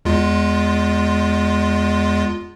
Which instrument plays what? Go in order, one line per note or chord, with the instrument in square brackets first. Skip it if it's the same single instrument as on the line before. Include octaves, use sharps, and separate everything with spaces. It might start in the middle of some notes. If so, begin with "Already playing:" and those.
[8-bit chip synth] E2 G#3 F4